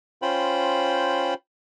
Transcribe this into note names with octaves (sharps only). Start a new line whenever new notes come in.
C#4 F4 C5 G5 B5